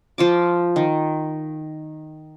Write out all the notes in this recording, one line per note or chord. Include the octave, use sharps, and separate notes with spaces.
F3 F4 D6
D#3